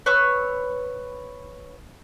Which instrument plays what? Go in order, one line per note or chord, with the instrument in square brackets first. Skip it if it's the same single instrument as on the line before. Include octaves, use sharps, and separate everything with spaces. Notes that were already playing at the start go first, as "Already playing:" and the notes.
[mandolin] B4 C#5 C#6 E6